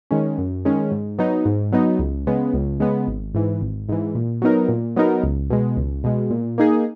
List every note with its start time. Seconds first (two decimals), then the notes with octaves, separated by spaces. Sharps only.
0.11 D#3 G#3 C#4
0.38 F#2
0.65 D#3 G#3 C#4
0.91 G#2
1.18 F#3 B3 D#4
1.46 G#2
1.72 F#3 B3 D#4
1.99 C#2
2.27 C#3 G#3 B3
2.54 C#2
2.80 C#3 G#3 B3
3.07 G#1
3.34 G#2 E3
3.61 G#1
3.89 G#2 E3
4.15 A#2
4.42 F#3 B3 D#4 A#4
4.68 A#2
4.96 F#3 B3 D#4 A#4
5.23 C#2
5.50 B2 G#3
5.77 C#2
6.04 B2 G#3
6.30 A#2
6.58 A#3 D#4 G#4